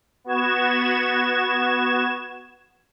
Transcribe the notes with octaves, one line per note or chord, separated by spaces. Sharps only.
B3 F#4 G#6 E7